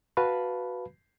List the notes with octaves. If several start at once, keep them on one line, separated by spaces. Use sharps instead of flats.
F#4 B4 F5 A5 B5